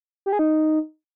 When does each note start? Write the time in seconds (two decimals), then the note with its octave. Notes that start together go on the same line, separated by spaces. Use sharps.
0.26 G4
0.33 G#4
0.39 D#4